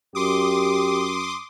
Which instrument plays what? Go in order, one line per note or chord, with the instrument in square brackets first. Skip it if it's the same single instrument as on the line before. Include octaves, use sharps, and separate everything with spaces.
[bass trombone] F#2 [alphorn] G4 [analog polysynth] C6 D6 D#6